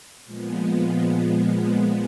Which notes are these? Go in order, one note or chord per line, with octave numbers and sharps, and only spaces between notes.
A#2 F3 G#3 B3